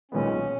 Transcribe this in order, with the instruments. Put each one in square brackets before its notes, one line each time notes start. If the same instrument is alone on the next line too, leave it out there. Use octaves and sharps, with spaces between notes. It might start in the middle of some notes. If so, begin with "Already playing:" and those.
[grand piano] B1 A#2 G#3 B3 [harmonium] C#4